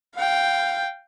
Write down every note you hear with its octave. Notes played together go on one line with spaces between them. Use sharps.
F5 G5